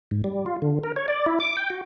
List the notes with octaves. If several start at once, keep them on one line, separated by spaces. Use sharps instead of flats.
G#2
G3
F4
D3
A#4
C#5
D5
E4
D6
G5
F#4